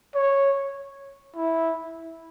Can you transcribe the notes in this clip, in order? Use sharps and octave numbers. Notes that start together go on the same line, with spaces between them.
C#5
E4